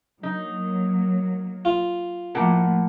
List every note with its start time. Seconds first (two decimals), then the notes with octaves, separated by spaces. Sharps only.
0.23 F#3 A#3 D#4
1.65 F4
2.35 A2 F3 A3 A#3 F#5